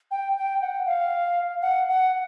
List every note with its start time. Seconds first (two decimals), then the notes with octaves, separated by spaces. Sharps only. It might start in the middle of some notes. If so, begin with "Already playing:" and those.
0.11 G5
0.37 G5
0.62 F#5
0.86 F5
1.62 F#5
1.88 F#5